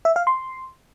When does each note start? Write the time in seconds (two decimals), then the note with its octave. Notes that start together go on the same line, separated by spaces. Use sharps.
0.05 E5
0.16 F5
0.27 C6